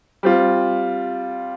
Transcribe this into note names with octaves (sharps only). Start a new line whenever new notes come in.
G3 C4 F4